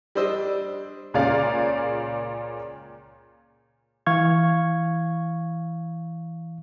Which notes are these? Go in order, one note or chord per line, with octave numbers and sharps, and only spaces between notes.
G3 D4 C5 D#5 E6
C#2 A#2 C#4 G#4 D5 F5
E3 F5 C#6 G#6